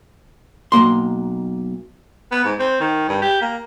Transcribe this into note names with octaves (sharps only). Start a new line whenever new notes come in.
B1 G2 A#3 C6
B3
G#2
C4
D#3
G2
G4
A#3